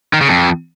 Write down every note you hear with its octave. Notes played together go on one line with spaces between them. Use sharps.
D#3
C#3
F2